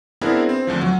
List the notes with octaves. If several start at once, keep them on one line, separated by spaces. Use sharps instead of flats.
B3 C4 D4 E4 G#4 A#4
C4
D2 D3 F3
F#3